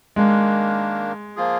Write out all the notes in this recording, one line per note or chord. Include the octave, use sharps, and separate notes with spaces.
D#3 G#3 A#3 D4
F3 A#3 F4 G#4